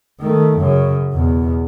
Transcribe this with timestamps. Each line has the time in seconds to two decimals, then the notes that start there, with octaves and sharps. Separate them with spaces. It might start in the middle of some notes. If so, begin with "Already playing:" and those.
0.21 D#3 A3
0.58 F#2 C#3
1.13 E2 B2